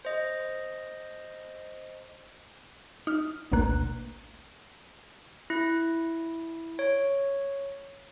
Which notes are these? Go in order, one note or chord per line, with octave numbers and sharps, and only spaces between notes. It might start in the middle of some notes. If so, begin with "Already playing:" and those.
C5 D#5
D#4 F6
A1 D2 B2 A#3 F#6
E4
C#5